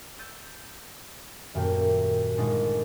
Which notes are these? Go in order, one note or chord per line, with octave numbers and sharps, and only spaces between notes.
E6 G6 A6 D#7
D#1 F#2 A#2 A3 A#3 G5
G1 A#2 G#3 D#4 D5 A6